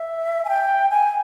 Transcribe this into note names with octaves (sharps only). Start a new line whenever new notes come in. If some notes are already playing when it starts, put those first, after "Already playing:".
Already playing: E5
G#5
G5
G#5